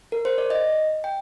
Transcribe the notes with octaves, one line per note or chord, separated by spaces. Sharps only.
A#4
C5
D5
D#5
G5